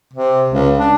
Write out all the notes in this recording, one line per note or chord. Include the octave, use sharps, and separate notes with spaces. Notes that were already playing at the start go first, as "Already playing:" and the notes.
C3
C#2
D4